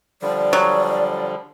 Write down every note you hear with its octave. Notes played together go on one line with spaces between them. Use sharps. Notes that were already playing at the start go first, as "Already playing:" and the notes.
D3 F3 G3 D5
F#3